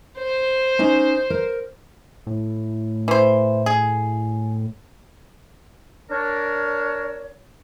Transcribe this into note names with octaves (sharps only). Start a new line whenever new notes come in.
C5
C#4 D#4 G#5
A#4
A2
E3 C5
G#4
D4 A#4 C#5